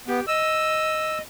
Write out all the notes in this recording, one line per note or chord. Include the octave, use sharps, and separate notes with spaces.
B3 G4
D#5 E6